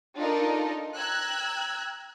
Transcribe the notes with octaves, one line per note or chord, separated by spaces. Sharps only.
D4 D#4 F4 A4 A#4 D#5
G5 A#5 E6 F#6 G#6